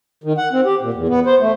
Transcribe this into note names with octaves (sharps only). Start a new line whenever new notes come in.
D#3
F#5
C4
G4
A#2
E2
B3
C5
A3